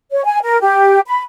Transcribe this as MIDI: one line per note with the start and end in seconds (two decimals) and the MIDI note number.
0.11 0.24 73
0.25 0.39 80
0.43 0.60 70
0.61 0.99 67
1.07 1.22 83